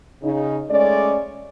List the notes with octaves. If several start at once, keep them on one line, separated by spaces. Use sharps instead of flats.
C#3 D#4
G#3 A3 C#4 D5